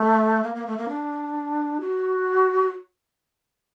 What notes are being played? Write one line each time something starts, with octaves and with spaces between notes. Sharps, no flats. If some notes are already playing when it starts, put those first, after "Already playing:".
Already playing: A3
A#3
A#3
A3
A#3
D4
F#4